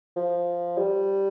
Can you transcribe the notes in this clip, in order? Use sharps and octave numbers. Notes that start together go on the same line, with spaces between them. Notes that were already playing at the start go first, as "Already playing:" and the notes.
F3
G3